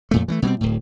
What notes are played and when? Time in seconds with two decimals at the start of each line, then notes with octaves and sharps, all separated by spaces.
0.11 F2 A#2 A3
0.28 E3 G#3 A3
0.42 B2 G3 A3 C4
0.61 D1 A2